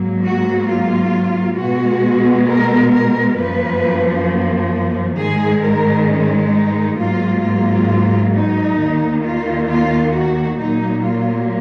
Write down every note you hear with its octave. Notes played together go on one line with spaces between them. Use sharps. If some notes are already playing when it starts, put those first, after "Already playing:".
Already playing: G#2 F#3 A#3
F#4
F4
B2 G#3 B3 F#4
A#4
A#4
F#2 F3 A#3 B4
G#2 D#3 G#3 G#4
A#4
C#4
D#4
G#2 F#3 A#3 F4
F4
D#4
D#2 D#3 A#3
F4
F4
F#4
A#2 F#3 A#3 D#4
F4